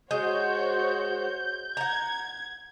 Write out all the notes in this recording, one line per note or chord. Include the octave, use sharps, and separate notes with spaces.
G#3 F#4 C5 C#5 G6
F#5 A#5 G#6